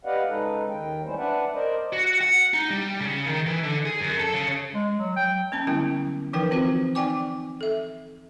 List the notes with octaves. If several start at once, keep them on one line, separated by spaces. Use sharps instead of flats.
G4 B4 D5 D#5 F5 F#5
C#3 G#3 D#4 A4 B4
D#2 D#3 G5
E3 G3 A3 C#4 E4 C5
D4 B4 D5 E5 F#5 A5
A#4 C5 D5 D#5
F#4
F#5
D#4
G3
C#3
D#3
E3
D3
G#4
F#2
A4
C#3
G#3
F#3
G5
A#3 C#4 A5
D3 F#3 G3 B3 E4 G5
E3 F3 D#4 A#4 B4 G5
C4 F4 F#4 C5
D#4 D5 G5 G#5 D6
A4 E5